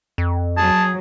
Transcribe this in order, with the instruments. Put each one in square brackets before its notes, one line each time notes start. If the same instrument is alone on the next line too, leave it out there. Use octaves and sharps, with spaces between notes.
[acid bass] F2
[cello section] F#3 [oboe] G#4 [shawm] A5